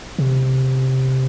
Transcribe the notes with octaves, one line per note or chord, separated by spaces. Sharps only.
C3